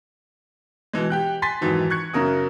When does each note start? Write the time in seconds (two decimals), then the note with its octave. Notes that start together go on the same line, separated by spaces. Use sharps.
0.93 B2 E3 G#3
1.10 G4 G5 F#6
1.42 G#5 C6 A6 B6
1.61 F2 G#2 D#3 E3 F#3
1.90 C#6 F#6 G#6 C#7
2.13 F#2 C#3 A#4 D#6